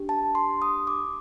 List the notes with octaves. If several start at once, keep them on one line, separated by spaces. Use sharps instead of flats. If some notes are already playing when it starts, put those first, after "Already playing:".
Already playing: D4 G4
A5
C6
D#6
D6